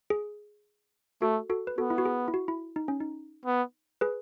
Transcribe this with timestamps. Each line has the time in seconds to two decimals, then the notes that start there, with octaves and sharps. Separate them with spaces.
0.10 G#4
1.22 A3 F#4 A4
1.50 F#4 A4
1.67 B4
1.78 B3 F#4 A4
1.90 E4
1.98 F#4
2.05 G#4
2.28 E4
2.34 F#4
2.48 E4
2.76 D#4
2.88 C#4
3.00 D#4
3.45 B3
4.01 G#4 B4